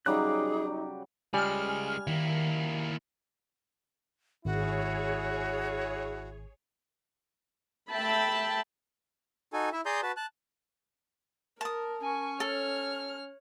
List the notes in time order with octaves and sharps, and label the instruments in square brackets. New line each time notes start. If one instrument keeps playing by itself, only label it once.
[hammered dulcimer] C#3 F#3 G3 [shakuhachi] D#4 [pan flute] G#4 [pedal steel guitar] G5 D6 F#6
[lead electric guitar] C#3 G#3 [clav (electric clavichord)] G3 [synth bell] G#5 F6
[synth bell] D#3 [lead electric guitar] A#3 E4
[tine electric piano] G#1 [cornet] E4 [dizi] F#4 [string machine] G#4 C#5
[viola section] A3 E5 G5 A5 B5
[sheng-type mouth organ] D#4 F#4 A4 G#5
E4 E5
G#4 D5 A#5 C6 D#6 G6
F#4 B4 A5
A5 F#6
[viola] A#4 [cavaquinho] A5 D#6
[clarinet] C#4 [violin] G#5 C#6
[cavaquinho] A4 [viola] C#5 [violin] F6